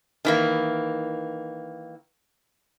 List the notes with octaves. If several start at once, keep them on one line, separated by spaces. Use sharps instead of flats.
D#3 E3 A#3